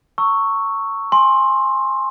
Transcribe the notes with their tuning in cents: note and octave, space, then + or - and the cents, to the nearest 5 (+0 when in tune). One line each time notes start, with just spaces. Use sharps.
A#5 -40 C#6 +0 E6 +0
G#5 +0 C6 +15